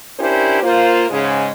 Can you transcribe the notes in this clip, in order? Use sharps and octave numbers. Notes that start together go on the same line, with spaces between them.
C#4 D4 E4 G4 A#4 C5
A#3 F4 C5
G#2 C#3 G#3